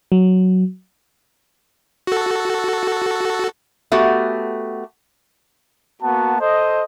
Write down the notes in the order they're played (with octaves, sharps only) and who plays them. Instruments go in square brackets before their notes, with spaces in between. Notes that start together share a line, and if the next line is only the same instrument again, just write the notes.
[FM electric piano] F#3
[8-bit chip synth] F#4 A4
[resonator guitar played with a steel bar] A3 B3 F#4 G4
[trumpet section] A#3 B3 F#4 A5
A4 C5 D#5